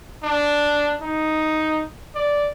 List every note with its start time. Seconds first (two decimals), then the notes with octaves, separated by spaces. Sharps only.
0.23 D4
1.02 D#4
2.15 D5